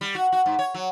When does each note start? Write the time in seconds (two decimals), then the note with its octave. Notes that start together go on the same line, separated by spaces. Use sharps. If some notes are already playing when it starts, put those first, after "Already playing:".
0.01 G3
0.15 F#4
0.32 F#4
0.46 G#2
0.59 C#5
0.74 F#3